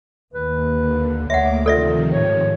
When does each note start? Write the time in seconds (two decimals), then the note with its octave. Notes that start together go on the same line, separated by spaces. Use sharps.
0.34 D#2 B4
0.74 D3
1.30 D2 A#3 C#5 E5 F#5 D6
1.66 C3 D#3 F3 F4 A4 D5 E5
2.13 G#2 C#5